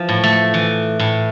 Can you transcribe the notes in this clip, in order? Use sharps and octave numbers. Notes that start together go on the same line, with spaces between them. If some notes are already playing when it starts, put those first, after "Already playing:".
Already playing: E3 F3
A2
A3
E3
A2